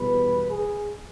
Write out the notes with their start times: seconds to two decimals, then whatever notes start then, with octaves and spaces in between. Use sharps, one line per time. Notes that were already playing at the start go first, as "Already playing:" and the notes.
Already playing: E2 B2 G3 B4
0.49 G#4